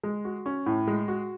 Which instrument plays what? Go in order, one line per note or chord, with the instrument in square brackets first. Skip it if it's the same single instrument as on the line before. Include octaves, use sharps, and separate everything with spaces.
[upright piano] G#3
F#4
C#4
A2
G#3
F#4